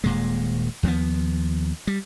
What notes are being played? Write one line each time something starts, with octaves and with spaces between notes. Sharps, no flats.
D#1 A#2 G#3
D#2 F3 A3 B3
G3